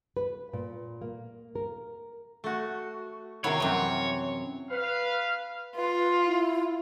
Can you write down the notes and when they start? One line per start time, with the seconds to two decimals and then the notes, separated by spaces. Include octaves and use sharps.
0.17 B4
0.53 A#2
1.02 A#3
1.55 A#4
2.44 A3 F#4
3.44 C3 D#3 B3 E4 C#5
3.60 F#2 E3 G3 C4
4.71 B4 F5
5.76 F4 B4
6.26 E4